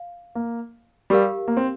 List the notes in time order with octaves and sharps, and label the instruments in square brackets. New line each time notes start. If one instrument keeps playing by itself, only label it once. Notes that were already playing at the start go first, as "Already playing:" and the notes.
Already playing: [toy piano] F5
[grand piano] A#3
[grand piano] G3 [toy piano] G4 A#4 F5
[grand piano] A#3
C4